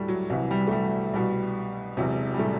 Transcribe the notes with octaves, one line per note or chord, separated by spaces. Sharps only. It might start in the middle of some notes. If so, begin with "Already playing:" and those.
Already playing: D2 A2 G3 A3
F#3
C2 C3 E3 F#3
G3
A3
G3
C2 B2 G3
E1 E2 C3 F#3
G3
A2 A3